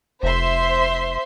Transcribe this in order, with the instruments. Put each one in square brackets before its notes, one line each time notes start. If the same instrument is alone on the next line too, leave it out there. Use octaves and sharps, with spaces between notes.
[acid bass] F1 [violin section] C5 E5 C6